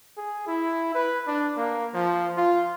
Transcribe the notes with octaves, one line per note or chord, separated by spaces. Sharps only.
G#4
E4
B4
D4
A#3
F3
F4